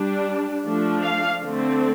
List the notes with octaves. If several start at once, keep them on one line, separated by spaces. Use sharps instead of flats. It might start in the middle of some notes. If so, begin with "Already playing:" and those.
Already playing: G3 D4
F3 A3 D4
F5
D3 A3 C4